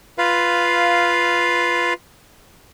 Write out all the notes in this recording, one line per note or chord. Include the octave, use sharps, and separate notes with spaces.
F4 B4 F5